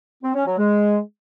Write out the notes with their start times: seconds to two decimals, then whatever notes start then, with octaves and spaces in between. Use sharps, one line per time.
0.23 C4
0.35 C#4
0.46 F#3
0.58 G#3